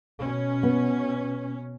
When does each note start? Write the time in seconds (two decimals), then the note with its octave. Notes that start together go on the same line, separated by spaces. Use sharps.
0.20 B2 C#4
0.63 B3